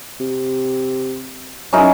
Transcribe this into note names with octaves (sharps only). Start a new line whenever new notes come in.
C3
F#2 C#4 D#4 E4